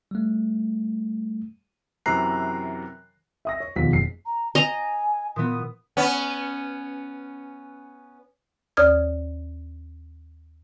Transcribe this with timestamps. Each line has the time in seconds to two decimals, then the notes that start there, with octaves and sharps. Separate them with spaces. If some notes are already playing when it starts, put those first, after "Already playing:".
0.11 G3 A3
2.06 F#2 C3 E3 A#5 F#6 C7
3.45 E5 D#6 A#6
3.60 C#5
3.76 E1 D#2 B2 F3 B6
3.91 F#1 C7
4.26 A#5
4.55 D#5 G#5 A#5
5.36 A#2 E3 B3 D#6
5.97 B3 C#4
8.77 D#2 C#5 D5 D#6 F6 G#6